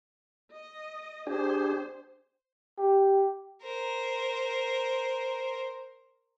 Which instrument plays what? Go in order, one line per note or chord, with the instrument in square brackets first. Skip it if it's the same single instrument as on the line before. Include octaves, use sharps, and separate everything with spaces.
[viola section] D#5
[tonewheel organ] D4 G4 G#4 [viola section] C5
[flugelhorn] G4
[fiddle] A#4 C5